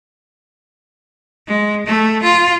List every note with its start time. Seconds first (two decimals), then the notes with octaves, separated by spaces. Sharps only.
1.47 G#3
1.87 A3
2.23 F4